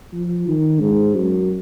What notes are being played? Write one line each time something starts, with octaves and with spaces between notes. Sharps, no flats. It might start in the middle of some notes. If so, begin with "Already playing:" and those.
F3
D#3
G#2
F#2